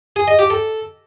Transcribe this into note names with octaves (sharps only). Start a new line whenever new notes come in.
G#4
D#5
G4
A4